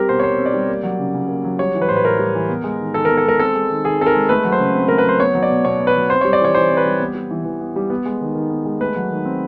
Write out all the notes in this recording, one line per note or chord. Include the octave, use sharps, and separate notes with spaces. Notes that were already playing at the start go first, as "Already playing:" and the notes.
Already playing: G3 C4 G4 A#4
B2 C5
C#5
B2 C5
C4
D5
G3
A#3
F#3
C#3
C#3
A#3
F#3
G3 C#5
E3
B4
A2 C5
B4
A2 A#4
G3
E3
B3
G#3
D#3
D#3 A4
B3 A#4
A4
G#3 A#4
C4 A4
G#3
D#3
D#3 G#4
C4 A4
A#4
G#3
A3 B4
F#3
C5
C#3
C4
A3 A#4
B4
F#3 C5
B3 C#5
F#3
D5
B2
B2 C#5
B3
B4
F#3
C4 C5
G3 C#5
D5
E3 C#5
E3 C5
C4
B4
G3
B3
G3
E3
E3
B3
G3
B3
G#3
D#3
D#3
B3
G#3
A3 B4
F#3
D#3
C4